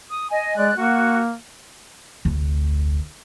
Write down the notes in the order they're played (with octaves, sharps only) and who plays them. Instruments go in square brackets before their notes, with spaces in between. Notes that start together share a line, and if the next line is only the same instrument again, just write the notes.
[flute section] D#6
D#5 G#5
[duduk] G#3 [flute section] D5 F#6
[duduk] A#3 [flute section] F#4
[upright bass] F1 D2